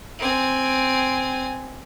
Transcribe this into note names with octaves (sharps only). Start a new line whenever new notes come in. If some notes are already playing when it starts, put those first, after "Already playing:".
C4 G#5